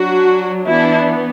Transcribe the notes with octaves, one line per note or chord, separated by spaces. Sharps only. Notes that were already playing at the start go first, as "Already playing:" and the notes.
Already playing: F#3 D4 F#4
E3 B3 D4 E4